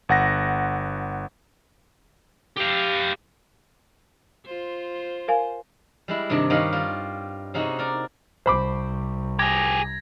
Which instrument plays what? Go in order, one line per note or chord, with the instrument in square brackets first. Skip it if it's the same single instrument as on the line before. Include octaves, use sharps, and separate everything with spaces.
[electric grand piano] G1 F#5 A#6
[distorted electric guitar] G4 F5
[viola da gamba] F4 C5
[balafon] A#4 F5 G#5
[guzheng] G3 G#3 E4
G2 C3 D#3 D4 D#5
G2 D#3 G4 C#5 D#5 F5
G3 F4
C3 C#4 D#4 F#4 G#4
A#4 D5
[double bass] C2 [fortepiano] C5 B5 D6
[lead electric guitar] G4 G#4 [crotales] G#6 A#6